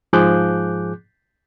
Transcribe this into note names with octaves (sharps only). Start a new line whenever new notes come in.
G#2 F3 G#4 D6 F#6 G6